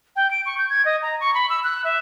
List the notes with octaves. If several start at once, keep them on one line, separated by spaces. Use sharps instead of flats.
G5
D7
C#6
G6
G#6
D#5
A#5
C#6
B5
E6
F#6
E5